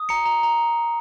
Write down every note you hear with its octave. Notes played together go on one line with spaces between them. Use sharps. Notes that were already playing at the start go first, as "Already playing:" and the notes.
Already playing: D#6
A#5 C#7
A#5
A#5